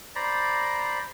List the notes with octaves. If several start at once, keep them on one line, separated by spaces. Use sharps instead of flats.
C5 D5 A#5 B5